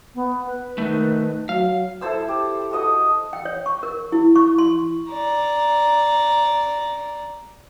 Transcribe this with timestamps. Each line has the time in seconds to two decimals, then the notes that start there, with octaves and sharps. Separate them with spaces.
0.15 B3
0.46 B4
0.78 D#3 A3 D#4
1.49 F#3 F5
2.01 E4 A4 C5 E6
2.29 G4
2.71 F#4 A4 D#5 D#6
3.33 G5
3.45 C#5
3.66 C#6
3.83 A#4
4.12 E4
4.36 C#6
4.58 C6
5.11 D5 A#5